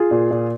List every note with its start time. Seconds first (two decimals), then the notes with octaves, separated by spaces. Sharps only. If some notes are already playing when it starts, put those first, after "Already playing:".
Already playing: F4 G#4
0.11 A#2
0.31 A#2